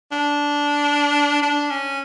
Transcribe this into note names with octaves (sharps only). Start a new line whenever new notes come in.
D4
D4
C#4